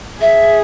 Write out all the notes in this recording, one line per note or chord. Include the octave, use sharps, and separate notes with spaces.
G#4 E5